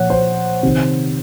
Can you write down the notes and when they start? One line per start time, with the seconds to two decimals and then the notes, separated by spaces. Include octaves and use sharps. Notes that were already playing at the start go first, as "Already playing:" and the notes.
Already playing: A#2 F3 C#5 F#5
0.10 C5
0.63 C3 D#3